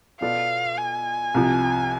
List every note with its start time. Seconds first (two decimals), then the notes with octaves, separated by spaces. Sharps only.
0.21 B2 B3 F4 A4 D5 F5
0.78 G#5
1.34 C2 C3 F3